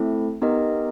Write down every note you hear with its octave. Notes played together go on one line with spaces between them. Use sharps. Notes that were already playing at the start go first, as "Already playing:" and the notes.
Already playing: A3 C4 E4 A4
B3 D#4 G4 A#4 D#5